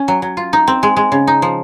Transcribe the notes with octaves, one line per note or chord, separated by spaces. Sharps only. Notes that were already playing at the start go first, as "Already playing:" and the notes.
Already playing: C#4
F#3
F#3
F4
D#4
C4
G#3
G#3
C#3
D#4
F3